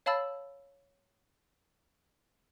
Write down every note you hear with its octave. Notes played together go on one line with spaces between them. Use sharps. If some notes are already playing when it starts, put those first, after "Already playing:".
C#5 F5 A5 B5 E6 A6